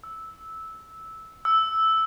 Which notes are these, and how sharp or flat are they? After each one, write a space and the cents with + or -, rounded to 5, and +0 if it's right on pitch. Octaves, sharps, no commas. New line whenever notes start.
E6 -10
E6 -5